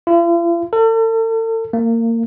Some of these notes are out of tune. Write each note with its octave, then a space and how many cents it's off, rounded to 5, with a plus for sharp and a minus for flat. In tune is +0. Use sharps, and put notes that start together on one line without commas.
F4 -45
A4 +40
A#3 -25